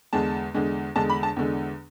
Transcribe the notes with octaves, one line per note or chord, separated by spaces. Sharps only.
E2 D3 G#3 A5
E2 D3 G#3
E2 D3 G#3 A5
B5
A5
E2 D3 G#3